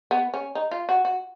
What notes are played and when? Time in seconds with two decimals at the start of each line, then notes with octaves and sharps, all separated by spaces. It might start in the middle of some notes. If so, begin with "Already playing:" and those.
0.11 B3
0.34 C#4
0.55 D#4
0.71 F4
0.89 F#4
1.05 F#4